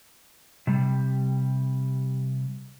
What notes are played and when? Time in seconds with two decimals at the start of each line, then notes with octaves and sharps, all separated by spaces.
0.67 C3 G3